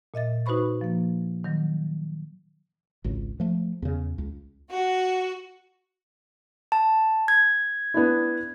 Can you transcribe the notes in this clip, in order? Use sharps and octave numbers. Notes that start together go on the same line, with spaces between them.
A#2 D#5 E5 A6
D#4 F#4 B4 C5 B5 C#6
F3 A#3
D#3 F#3
G#1 C#2
F3 A3
E2 C#3
C#2
F#4
A5
G#6
B3 D4 E4